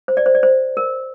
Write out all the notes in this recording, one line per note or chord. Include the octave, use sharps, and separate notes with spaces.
C5
D5
C5
D5
C5
A#4